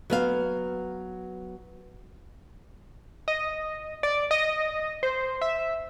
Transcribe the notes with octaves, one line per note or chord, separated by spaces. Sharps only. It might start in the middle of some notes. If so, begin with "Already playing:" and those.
F#3 B3 F5
D#5
D5
D#5
C5
E5